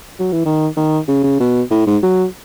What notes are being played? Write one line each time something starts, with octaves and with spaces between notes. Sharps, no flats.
F#3
E3
D#3
D#3
C#3
C#3
B2
A2
G#2
F#3